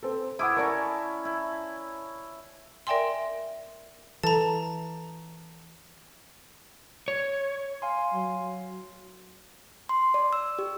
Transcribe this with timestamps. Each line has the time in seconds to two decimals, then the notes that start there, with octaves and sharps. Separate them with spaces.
0.03 C4 A4
0.39 E4 F#5 D6 D#6
0.56 C#4 A#4 D5 A5 A#5 C#6
1.25 E4
2.87 A#4 D5 E5 G5 G#5 C6
4.23 E3 A4 A5 A#5
7.08 C#5
7.82 F5 G#5 C6
8.14 F#3
9.89 C6
10.14 D5
10.33 E6
10.59 G4